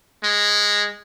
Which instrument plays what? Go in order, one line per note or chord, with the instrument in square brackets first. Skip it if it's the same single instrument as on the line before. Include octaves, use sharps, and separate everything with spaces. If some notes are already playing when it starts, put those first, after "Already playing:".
[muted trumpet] G#3